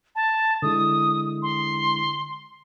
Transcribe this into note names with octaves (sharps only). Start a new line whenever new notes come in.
A5
D3 G#3 E4 D#6
C6